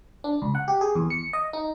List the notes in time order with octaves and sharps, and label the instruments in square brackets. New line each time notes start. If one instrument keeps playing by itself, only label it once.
[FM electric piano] D4
C#2
F#5
G4
G#4
E2
C#7
D#5
D#4